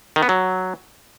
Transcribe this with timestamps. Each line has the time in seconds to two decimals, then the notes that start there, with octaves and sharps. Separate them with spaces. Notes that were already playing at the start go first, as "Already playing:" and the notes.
0.16 D#3
0.23 B3
0.29 F#3